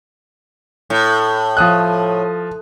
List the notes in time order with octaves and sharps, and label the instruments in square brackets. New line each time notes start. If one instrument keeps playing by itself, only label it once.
[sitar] A2
[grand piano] F3 D#6 F#6